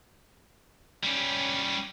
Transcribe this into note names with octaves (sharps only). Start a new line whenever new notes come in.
G3 C#4